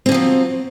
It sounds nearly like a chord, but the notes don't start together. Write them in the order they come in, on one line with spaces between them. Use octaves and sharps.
C4 D3 F3 F#3